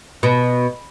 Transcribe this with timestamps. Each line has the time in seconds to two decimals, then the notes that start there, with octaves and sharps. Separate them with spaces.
0.23 B2